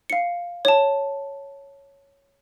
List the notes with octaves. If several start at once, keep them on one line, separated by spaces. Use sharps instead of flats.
F5 C#7
C#5 A5